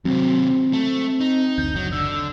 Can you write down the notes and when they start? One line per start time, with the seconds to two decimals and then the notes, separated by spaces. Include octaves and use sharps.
0.05 D#2 C3 F#3 C4
0.73 A3
1.21 D#4
1.58 F#1 D2 G6
1.76 F#3
1.92 D3 E6